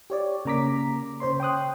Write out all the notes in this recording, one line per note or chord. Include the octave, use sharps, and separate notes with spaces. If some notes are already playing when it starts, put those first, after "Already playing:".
G4 C#5 D5
C#3 A#3 A#5 D6 B6
C#3 C5 C#5 C6
G5 C6 D#6 F#6